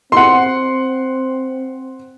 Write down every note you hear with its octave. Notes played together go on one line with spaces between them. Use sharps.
C4 F#5 C6